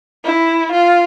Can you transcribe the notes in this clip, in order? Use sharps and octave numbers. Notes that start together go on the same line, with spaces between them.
E4
F4